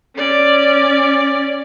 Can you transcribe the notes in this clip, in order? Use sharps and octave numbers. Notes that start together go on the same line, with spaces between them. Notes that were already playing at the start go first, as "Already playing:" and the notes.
C#4 D5